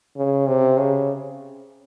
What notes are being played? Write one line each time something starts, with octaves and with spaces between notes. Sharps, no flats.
C#3
C3
C#3